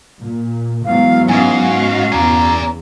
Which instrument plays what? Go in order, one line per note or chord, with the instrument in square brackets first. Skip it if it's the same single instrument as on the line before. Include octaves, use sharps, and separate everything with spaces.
[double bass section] A#2
[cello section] G#2 [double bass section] E3 F#3 B3 [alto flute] F5
[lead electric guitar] G#2 [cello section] C#4 F#4 F5 [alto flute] G#5
[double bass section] E2 [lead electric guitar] D5 G#5 [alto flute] A#5